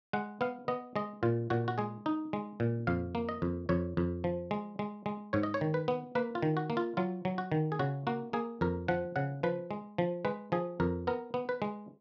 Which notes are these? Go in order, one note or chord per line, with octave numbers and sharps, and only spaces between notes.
G#3 F#5
B3 F5
B3 D#5
G#3 D#5
A#2 F4
A#2 F#4
F#4
G#3 G#4
D#4
G#3
A#2
F2 F5
A#3
D#5
F2
F2 C#5
F2
F3
G#3
G#3
G#3
G#2 C#5
D#5
C#5
D#3
B4
B3
A#3 B4
F4
D#3
F#4
A#3
F4
F#3 F4
F#3
F#4
D#3
G#4
C#3 F#4
A#3 F#4
A#3 G#4
F2 A#4
F3 F#5
C#3 F#5
F3 B4
G#3
F3
G#3 B4
F3 G#4
F2 A#4
B3 A#4
B3
B4
G#3